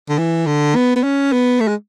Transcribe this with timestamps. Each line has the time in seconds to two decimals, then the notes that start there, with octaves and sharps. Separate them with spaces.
0.09 D3
0.18 E3
0.46 D3
0.75 B3
0.96 B3
1.03 C#4
1.32 B3
1.60 A3
1.68 G#3